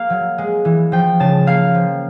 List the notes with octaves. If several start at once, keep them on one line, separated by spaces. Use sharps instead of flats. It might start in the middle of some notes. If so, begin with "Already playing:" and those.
Already playing: A#3 F5
F#3
G#3
E3
F3 G5
C#3 A5
A#3 F5
F3